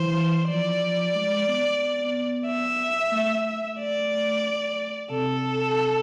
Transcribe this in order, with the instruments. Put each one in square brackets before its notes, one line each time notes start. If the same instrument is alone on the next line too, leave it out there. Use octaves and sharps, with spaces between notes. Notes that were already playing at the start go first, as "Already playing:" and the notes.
Already playing: [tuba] E3 [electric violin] C5
[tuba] F3 [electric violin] D5
[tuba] G#3
B3
[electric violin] E5
[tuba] A3
[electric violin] D5
[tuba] C3 [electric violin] A4